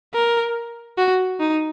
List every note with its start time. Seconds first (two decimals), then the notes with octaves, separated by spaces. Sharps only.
0.14 A#4
0.98 F#4
1.40 D#4